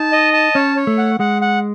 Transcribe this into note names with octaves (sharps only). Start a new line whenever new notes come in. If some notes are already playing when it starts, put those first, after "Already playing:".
Already playing: D#4 A5
D#5
A5
C#4 C#5
C#5
A3
F#5
G#3 F#5
F#5